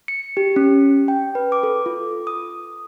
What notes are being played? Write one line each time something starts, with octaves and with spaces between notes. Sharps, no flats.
C#7
G4
C#4
G5
B4
D6
A4
F4
D#6